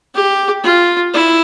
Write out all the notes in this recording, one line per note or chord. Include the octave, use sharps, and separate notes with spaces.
G4
F4
E4